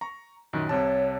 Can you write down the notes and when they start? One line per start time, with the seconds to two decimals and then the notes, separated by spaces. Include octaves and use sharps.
0.01 A#5 C#6
0.53 F#2 A#2 D#3
0.69 C2 C3 C#5 A5